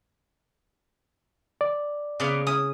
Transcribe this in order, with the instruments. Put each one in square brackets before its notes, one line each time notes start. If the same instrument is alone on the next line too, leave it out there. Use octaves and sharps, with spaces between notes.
[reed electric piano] D5
[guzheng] C#3 [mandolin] A#3 B3 F4
[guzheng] C#4 E4 [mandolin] D#6